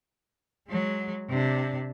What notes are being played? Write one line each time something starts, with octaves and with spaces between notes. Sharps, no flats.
F#3 G#3
C3 D4